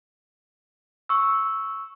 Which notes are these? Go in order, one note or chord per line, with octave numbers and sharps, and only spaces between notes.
C#6 E6